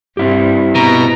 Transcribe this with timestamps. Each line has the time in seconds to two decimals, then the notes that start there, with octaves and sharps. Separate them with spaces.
0.17 G2 C4 E4 G4
0.75 B2 A#5